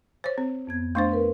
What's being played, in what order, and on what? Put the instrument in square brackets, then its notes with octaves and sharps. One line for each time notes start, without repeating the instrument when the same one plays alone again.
[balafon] C5 C#5
C4
[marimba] F2 B3 G#6
[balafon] A3 D4 C5 [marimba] F5 C6 C#6
[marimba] A#4 B4